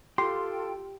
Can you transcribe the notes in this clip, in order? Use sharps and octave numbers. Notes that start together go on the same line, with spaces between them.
F4 G4 A4 G5 C6